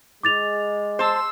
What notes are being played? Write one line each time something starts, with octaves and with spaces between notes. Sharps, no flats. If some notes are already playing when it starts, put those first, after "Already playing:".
G#3 D6 A6 F7
C5 A5 C6 E6